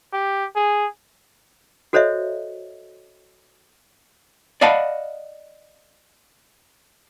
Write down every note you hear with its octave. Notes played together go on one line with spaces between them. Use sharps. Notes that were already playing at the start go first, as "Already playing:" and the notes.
G4
G#4
F#4 A4 C5 C#5 D#5 E5
D5 D#5 F5 F#5 A5 B5